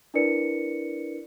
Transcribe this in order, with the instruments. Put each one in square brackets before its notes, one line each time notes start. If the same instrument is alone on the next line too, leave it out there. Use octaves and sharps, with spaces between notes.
[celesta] D4 E4 A#4 B4 D5 C#7